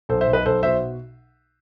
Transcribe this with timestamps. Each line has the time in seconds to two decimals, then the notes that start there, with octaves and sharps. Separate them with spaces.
0.09 B1 A4 C5
0.21 C5 E5
0.27 B1
0.33 B4 D#5
0.46 B1 A4 C5
0.63 B2 C5 E5